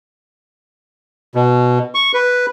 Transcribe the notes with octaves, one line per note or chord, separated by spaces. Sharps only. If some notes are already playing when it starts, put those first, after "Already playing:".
B2
C#6
B4